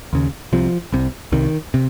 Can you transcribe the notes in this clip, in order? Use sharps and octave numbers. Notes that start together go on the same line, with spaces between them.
D#2 C#3
C2 C3 F3
C2 C3
C2 C3 D#3
C3